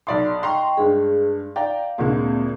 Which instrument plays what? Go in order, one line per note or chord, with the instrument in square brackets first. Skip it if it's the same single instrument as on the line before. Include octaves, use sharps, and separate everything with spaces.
[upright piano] B1 D5 C6 [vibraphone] B5 D#6
[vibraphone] D#5 G5 C#6 [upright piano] A#5 C6
[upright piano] G2 G#3 [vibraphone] G#4
[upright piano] D5 G5 A#5 [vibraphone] F5
[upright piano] D2 A#2 G#3 [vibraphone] A#3 C4